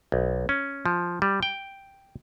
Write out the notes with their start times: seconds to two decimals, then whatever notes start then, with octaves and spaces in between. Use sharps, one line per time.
0.12 B1
0.49 C#4
0.86 F3
1.22 G3
1.43 G5